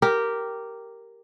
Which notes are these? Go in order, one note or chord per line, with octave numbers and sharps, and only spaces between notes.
G4 A#4